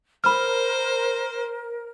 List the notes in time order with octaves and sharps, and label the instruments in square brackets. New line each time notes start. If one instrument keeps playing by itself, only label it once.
[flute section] A#4 [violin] C5 [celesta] B5 F6